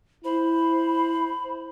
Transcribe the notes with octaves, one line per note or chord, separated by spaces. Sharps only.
E4 C5 B5